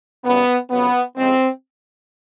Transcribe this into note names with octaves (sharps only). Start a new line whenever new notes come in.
F#2 C#3 E3 G3 B3
F2 C#3 F#3 B3
F2 C#3 F3 G#3 C4